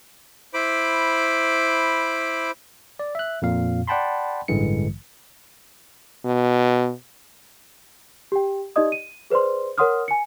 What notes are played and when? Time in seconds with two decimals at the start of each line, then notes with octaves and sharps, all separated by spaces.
0.54 E4 C5 B5 D6
2.99 D5
3.15 E5 F#6
3.42 F2 A#2 F5
3.88 D5 F#5 G5 A5 B5 C6
4.48 A1 G2 D3 E3 G#3 C#7
6.25 B2
8.32 G4 G5
8.76 D#4 G4 D5 D#5 D#6
8.92 D#7
9.30 G#4 B4 C5 D5 C6
9.78 A#4 C#5 F#5 C6 D#6 F6
10.08 G#5 C#7